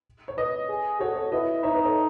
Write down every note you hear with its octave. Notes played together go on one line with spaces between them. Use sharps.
C#5
B4 D#5
G#4
F#4 A4 C#5
A4 C#5
E4 B4 D#5
D#4 C#5 E5
B4 D#5
A4 C#5